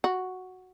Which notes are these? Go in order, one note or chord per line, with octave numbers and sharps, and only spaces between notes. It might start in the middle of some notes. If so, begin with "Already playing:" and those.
F#4